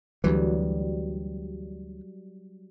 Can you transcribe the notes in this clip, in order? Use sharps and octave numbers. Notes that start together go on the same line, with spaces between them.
D2 E3 F#3 G3